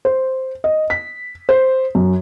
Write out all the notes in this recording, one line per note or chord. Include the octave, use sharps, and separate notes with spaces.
C5
D#5
B6
C5
F#2